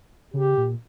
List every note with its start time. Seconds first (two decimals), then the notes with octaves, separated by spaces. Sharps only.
0.34 C#3 G4
0.57 A#2